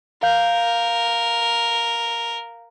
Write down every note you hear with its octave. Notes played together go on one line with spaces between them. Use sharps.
A#4 F5 G6